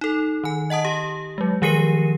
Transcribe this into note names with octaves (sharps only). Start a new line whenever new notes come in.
D#4 A4
D#3 G#5
D#5 F#5 A5 D#6
G4
F#3 G#3
D#3 F3 G4 A#4 C7 D#7